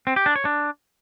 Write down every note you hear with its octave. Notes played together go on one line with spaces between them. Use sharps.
C4
G4
D4
C#5
D4